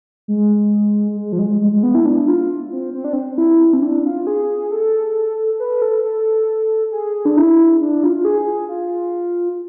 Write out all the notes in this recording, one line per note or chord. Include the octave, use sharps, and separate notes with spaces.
G#3
G#3
F3
G#3
G#3
G#3
B3
E4
D4
F4
C4
C4
D4
C4
E4
C4
D4
F4
G#4
A4
B4
A4
A4
G#4
D4
E4
D4
F4
F4
G#4
F4